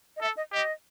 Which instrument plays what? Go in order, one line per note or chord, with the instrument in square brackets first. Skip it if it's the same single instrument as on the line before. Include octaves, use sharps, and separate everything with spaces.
[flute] D#5
[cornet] A4 [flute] E5
[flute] D#5
[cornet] G4 [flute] D#5